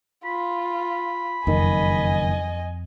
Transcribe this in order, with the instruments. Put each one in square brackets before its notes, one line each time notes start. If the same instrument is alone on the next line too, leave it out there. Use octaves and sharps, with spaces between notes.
[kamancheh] F4 [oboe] B5
[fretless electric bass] F#1 D#3 [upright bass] F2 [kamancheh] D#5 G#5